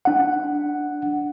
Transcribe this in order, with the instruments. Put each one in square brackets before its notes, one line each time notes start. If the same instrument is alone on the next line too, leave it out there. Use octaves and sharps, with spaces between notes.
[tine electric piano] D4 F#5